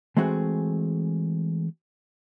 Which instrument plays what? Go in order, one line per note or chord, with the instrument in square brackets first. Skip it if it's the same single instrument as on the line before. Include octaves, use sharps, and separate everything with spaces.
[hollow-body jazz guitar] E3 G#3 A3 C4 F#4 G#4